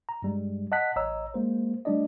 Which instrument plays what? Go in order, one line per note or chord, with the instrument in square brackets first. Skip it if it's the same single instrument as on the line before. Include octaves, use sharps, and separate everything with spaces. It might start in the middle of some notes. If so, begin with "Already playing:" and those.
[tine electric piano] A#5
G2 G3 G#3
D#5 F#5 A5 F#6 B6
A1 C#5 D#5 A#5 E6
G#3 A#3 C5
G3 A3 D4 D5 D#5